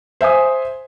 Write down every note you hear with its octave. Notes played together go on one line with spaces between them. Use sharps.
C5 E5 G#5 D#6